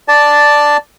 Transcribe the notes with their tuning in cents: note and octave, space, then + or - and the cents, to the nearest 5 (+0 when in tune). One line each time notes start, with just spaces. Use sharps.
D5 +0 A5 +0